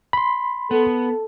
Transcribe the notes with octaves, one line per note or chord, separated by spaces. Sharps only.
B5 C6
B3 A4